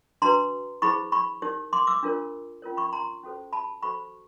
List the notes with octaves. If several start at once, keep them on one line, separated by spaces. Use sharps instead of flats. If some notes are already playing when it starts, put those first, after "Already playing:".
D4 F#4 B4 A#5 C6
E4 G#4 C5 B5 C#6
B5 C#6
D#4 G4 A#4 C#5
C6 D6
D6 E6
D4 F4 A#4 C#5
C#4 F4 A#4 C#5
B5 C#6
A#5 C6
C#4 F#4 A4 C5
A5 B5
F#4 A4 C5 B5 C#6